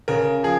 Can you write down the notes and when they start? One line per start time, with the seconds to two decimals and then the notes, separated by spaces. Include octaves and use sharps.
0.08 C#3 A#4
0.43 F3 G#4